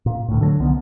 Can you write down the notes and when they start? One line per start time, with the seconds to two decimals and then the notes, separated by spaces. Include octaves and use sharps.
0.06 A#2
0.29 D2 A2
0.41 D3 F3 F#3
0.60 C2 D3 D#3 B3